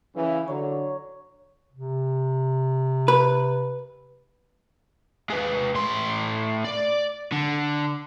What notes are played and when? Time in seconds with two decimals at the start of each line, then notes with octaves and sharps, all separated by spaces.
0.16 C#3 E3
0.48 D3 F#3 C#5
1.73 C3
3.08 B4
5.30 G#3 B4
5.75 A2 C6
6.64 D5
7.32 D3